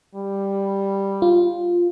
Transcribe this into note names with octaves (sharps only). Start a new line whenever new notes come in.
G3
F4